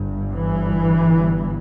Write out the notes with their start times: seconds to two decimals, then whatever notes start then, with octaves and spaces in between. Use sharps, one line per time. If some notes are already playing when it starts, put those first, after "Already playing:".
Already playing: G1 G2
0.35 E3